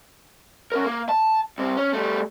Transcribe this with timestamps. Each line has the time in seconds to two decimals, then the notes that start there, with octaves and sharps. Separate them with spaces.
0.72 C#4 A#4
0.86 A#3
1.09 A5
1.58 C2 C3
1.77 C#4
1.93 G3 A3